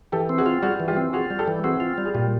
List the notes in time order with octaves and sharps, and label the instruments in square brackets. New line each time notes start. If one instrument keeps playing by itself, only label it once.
[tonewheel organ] E3 [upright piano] G4 A4
[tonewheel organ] C4
[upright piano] F#4 G#4
[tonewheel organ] F4
[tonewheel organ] G3 [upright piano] F#4 G#4
[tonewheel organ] E3
[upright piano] F4 G4
[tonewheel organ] C4
[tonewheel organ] F4 [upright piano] F#4 G#4
[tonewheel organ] G3
[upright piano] G4 A4
[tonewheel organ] E3
[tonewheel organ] C4 [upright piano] F#4 G#4
[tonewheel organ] F4
G3
[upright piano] G#4
[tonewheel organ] A#2 [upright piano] F4 G4